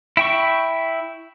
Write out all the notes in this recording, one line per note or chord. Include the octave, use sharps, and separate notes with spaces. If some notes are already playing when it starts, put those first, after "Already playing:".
E4 G5 C#6